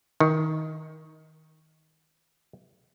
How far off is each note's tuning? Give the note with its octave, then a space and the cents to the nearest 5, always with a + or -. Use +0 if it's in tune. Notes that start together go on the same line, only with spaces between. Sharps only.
D#3 +15